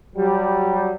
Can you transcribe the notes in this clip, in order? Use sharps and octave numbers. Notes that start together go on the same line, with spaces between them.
F#3 G3